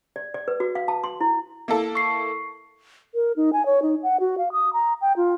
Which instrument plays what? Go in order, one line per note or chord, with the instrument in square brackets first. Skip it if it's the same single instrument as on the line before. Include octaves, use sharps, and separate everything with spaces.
[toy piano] D5
D5
B4
F#4
F5
A5
C6
E4
[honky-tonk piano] A#3 E4 A4
[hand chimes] C#6 C7
[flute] A#4
D#4
G#5
C#5
D#4
F#5
F#4
F5
D#6
A#5
G5
F4